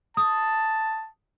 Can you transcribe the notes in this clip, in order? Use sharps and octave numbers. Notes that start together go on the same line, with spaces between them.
A5 D#6